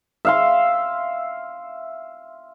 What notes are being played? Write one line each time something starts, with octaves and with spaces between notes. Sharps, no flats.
E5 F5 C6